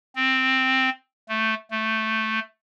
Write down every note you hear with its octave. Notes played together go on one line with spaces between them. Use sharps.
C4
A3
A3